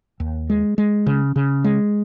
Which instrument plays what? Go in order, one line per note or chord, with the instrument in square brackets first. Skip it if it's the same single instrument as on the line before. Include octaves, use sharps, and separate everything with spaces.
[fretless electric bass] D#2
G#3
G#3
C#3
C#3
G#3